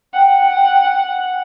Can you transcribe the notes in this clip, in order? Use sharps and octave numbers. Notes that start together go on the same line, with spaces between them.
F#5 G5